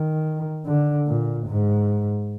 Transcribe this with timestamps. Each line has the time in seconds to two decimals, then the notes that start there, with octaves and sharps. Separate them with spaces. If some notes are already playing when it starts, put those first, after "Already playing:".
Already playing: D#3
0.66 D3
1.07 A#2
1.48 G#2